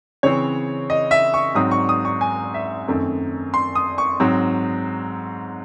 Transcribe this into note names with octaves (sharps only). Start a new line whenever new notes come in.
C#3 E3 C4 C#5
D#5
E5
C#6
G#2 F#3 C4 D#6
C#6
D#6
C#6
G#5
E5
F#2 D#3 A3 C4
C6
D#6
C#6
G#2 F#3 C4